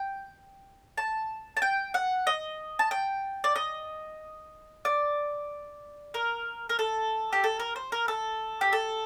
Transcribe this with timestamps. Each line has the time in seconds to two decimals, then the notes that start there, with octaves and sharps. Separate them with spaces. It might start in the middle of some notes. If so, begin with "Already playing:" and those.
Already playing: G5
0.97 A5
1.57 A5
1.62 G5
1.94 F#5
2.27 D#5
2.79 A5
2.91 G5
3.44 D5
3.56 D#5
4.85 D5
6.14 A#4
6.69 A#4
6.79 A4
7.33 G4
7.44 A4
7.59 A#4
7.76 C5
7.92 A#4
8.08 A4
8.61 G4
8.73 A4